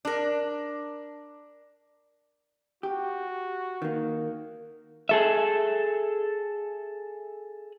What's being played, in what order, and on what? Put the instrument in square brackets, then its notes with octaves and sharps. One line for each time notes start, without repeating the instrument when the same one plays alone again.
[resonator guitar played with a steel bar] D4 A#4
[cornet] F#4 [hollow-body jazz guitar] G4
[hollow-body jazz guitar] D#3 A#3
[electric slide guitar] G#4 A4 E5